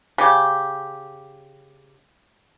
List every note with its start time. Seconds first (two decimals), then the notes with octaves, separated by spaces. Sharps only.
0.18 C#3 G4